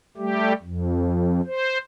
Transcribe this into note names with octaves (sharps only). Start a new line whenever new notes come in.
G3 A3 G4
F2
C5